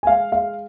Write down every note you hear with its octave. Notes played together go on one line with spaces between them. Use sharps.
G#5
G#3 F5
G#3 F5